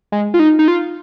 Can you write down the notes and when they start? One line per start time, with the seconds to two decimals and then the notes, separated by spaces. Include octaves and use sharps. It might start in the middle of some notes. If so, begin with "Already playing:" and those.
0.12 G#3
0.34 F4
0.39 D#4
0.59 D#4
0.68 F4